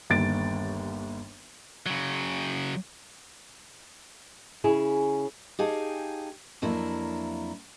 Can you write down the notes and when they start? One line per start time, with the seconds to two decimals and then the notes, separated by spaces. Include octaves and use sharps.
0.10 G1 D#2 A6 D7
1.86 C#3 F#3
4.64 C#3 E4 G#4
5.59 D#4 G4 G#4 F5 G#5 A5
6.62 F2 F#3 A#3 D4 E4